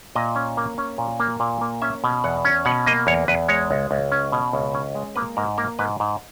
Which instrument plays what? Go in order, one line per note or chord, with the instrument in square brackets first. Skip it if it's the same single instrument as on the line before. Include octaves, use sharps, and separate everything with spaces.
[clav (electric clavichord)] A#2 D#5
C#4
A#3
C#4
A#2
A#3
A#2
A#3
C#4 E5
B2
E2 F#5
C#4
B2 F#5
A#3 D#5
E2 C#5
E2 B4
G#3 C#5
C#2
C#2
C#4
B2
C#2
C#4
G#3
A#3 B4
G#2 A#4
A#3 A#4
G#2 B4
G#2